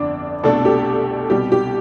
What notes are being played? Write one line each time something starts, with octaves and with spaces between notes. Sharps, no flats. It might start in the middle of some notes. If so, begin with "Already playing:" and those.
Already playing: G1 F2 D3 D4 D5
C2 B2 A3 D4 A4
G4
C2 B2 G3 G4
G4